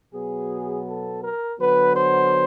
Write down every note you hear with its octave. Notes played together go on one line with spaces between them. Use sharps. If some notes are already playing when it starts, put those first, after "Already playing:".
B2 F#3 B3 G#4
A4
A#4
D3 F#3 B3 B4
C5